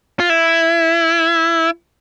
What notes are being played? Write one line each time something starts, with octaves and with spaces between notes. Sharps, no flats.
F4
E4